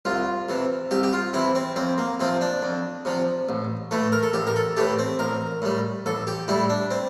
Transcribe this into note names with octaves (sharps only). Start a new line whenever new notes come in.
C2 F4
C3 E3
C2 G4
G4
F4
C3 E3 E4
C4
F2 C4
A#3
C3 F3 C4
D4
F2
C3 F3
A1
A2 E3 A3
A#4
A4
A1 G4
A#4
A4
A2 E3 A3 G4
C4
A1 A#4
A2 G3
A1 A4
G4
A2 G3 E4
D4
C4